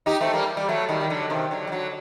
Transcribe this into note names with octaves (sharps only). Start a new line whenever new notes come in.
D#4 G4
A3 C4
G3 A#3
G3
F#3 A3
D#3 G3
D#3
D3 F#3
C3 D#3
D3 F#3
G3
D3 F#3